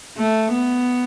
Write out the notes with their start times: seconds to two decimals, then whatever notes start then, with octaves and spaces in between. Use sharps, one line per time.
0.18 A3
0.53 B3